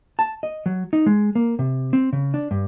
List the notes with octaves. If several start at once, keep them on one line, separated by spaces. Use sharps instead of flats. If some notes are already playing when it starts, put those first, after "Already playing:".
A5
D#5
F#3
D#4
G#3
A#3
C3
C4
C#3
D4
G2